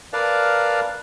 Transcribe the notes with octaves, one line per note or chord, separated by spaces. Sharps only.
A#4 B4 D5 F5 A5 A#5